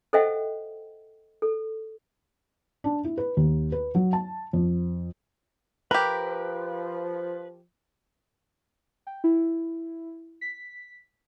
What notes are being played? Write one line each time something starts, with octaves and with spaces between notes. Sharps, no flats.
A4 C5 D#5 E5 F#5 G5
A4
D4
E4
B4
D#2
B4
F#3
A5
F2
F3 G4 A#4 B4
G5
E4
B6